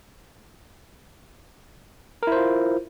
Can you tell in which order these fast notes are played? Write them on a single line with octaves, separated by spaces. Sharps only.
A#4 E4 C5 F4